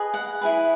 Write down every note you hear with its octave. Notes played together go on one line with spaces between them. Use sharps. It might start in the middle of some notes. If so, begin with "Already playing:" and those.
Already playing: G#4 B4 D#5
F#5
E4 G#4 B4